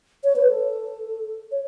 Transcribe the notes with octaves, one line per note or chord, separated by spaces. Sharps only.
C#5
B4
A4
C#5